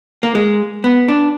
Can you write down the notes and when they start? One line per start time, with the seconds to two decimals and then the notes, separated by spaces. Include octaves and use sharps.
0.23 A#3
0.35 G#3
0.84 B3
1.08 D4